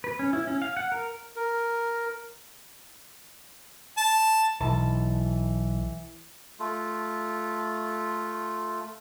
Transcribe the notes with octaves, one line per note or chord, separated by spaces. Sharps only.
B4
C#4
E4
C#4
F5
F#5
A#4
A#4
A5
B1 E3 A5
A3 F4